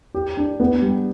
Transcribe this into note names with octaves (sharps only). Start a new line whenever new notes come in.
G4
D4
B3
G3